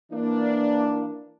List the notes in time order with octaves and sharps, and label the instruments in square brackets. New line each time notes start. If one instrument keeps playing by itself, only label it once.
[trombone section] E3 A#3 [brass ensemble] D4